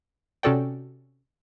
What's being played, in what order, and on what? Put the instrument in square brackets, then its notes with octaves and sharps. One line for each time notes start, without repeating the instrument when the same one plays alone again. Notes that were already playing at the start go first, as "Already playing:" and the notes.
[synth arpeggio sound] C3 C#4 F#4 A4 D5 G5